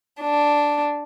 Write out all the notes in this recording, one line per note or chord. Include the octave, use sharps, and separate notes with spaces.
D4